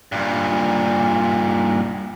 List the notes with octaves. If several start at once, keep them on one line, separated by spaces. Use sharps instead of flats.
G2 A#2